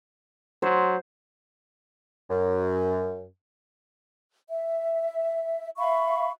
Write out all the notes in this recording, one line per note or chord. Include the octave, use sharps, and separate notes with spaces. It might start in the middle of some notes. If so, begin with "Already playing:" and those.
F#3 C5
F#2
E5
E5 F5 B5 C#6